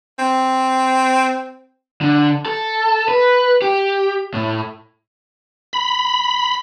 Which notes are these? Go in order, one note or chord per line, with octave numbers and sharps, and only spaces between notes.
C4
D3
A4
B4
G4
A2
B5